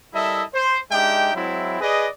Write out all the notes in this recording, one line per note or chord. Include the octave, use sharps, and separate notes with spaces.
G3 E4 A4 A#4 D#5 E5
C5
G#3 D4 D#4 G4 E5 G5
F#3 G#3 C4 E4
G#4 B4 D5 D#5